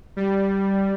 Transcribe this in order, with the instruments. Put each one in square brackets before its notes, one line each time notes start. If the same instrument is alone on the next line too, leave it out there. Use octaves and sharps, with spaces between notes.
[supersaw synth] G3